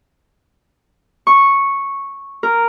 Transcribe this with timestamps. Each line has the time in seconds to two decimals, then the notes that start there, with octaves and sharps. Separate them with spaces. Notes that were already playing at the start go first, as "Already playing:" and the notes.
1.27 C#6
2.43 A#4